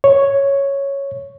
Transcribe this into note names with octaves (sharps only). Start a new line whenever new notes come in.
C#5